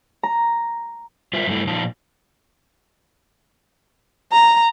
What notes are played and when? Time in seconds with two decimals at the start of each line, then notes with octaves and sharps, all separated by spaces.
0.23 A#5
1.33 G3 F4 A#4 C5 E5
1.47 G2 F#3 G3 A3 E4
1.67 A#2 F3 D#4 F4 A5
4.32 A#5